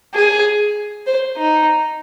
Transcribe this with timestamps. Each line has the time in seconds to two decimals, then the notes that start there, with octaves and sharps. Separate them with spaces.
0.14 G#4
1.07 C5
1.37 D#4